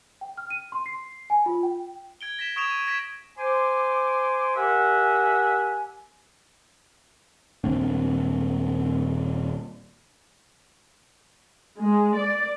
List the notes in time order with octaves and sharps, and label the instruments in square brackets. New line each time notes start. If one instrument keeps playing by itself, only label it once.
[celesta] G5
F6
D#7
C6
C7
G#5
F4
G5
[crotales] G#6 D7 G7
A#6 B6 E7
C#6 D#6 G#6 D7 E7 F7
D#7
G#6 A#6 B6 D7 E7
[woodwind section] C5 G#5 C6 D6
G4 A#4 E5 F#5 G#5
[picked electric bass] D#1 A#3 C4 D4
[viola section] G#3
D5